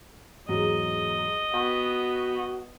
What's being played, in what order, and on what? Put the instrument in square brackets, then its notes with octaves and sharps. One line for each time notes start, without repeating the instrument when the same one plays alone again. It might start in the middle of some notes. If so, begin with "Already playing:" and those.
[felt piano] E2 G#2 F#3 [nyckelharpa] D#5
[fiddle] B3 [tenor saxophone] F#4 [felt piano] G5